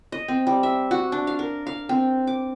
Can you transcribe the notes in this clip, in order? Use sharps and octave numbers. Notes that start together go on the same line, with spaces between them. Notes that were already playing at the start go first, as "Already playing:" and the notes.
D#5
C4
G3
E5
F#4
D4
F5
A#4
F5
C4
D6